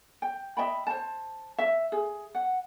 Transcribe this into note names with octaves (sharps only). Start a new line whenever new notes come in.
G5
D#5 E5 G5 B5
C5 A5
E5
G#4
F#5